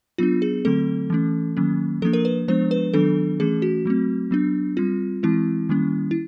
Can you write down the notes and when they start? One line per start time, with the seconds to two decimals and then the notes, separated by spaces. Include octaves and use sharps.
0.18 F#3 B3 D4 F4
0.42 G#4
0.65 D3 F#3 A3 C4 A4
1.10 E3 A3 C#4
1.57 D#3 F#3 A#3 C#4
2.02 F3 A#3 D4 A4
2.13 A#4
2.25 B4
2.48 F3 G#3 B3 D4 C5
2.71 B4
2.93 D#3 F#3 B3 D4 A4
3.40 E3 A3 C#4 G#4
3.62 F#4
3.85 F#3 A3 C4
4.31 F#3 B3 D4
4.77 G3 C4 F4
5.23 E3 G#3 C4 E4
5.69 D#3 G3 A#3 C#4
6.11 E4